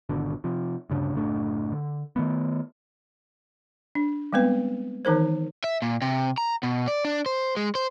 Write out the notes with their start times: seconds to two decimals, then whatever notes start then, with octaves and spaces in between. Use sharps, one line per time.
0.09 G#1 B2 D3
0.44 C3 F3
0.90 D2 G2 C#3 D4
1.15 F#1 A2 A3 D4
1.72 D3
2.16 D#3 A3 B3
3.95 D4
4.33 G3 G#3 B3 C4 B4
5.05 D#3 E3 D#4 A#4 C5
5.64 E5
5.82 A#2
6.02 C3
6.38 A#5
6.63 B2
6.88 D5
7.05 D4
7.26 C5
7.56 G#3
7.75 C5